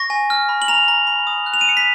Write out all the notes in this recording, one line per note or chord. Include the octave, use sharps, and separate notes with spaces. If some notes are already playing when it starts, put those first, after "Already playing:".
Already playing: C#6 A#6
G#5
F6
B5
F#7
A#5 F7
A#5
B5
D#6
F#6
F7
D#7
D#6 C#7
B6